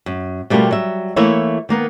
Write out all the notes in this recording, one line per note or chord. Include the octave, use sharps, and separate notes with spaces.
F#2
B2 G3 A3 F4 G4 A#4
F#3 G3 E5
E3 A3 A#3 E4 C#5 E5
D#3 A#3 B3